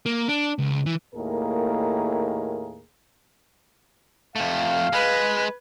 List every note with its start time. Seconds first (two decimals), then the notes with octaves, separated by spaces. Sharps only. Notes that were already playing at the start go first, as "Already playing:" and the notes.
0.06 A#3
0.28 D4
0.59 C#2
0.86 E3
1.14 D#2 A2 A#3 G#4 A#4
4.36 F2 A3 F5
4.93 G#3 B4